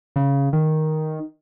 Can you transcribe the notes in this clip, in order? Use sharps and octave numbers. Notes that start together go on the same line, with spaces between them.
C#3
D#3